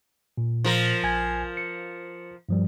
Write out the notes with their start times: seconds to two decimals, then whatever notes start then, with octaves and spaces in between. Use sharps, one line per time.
0.37 A#2
0.64 F3 A#4
1.03 A#1 G#5 G#6
1.57 C#7
2.49 G2 F3 G3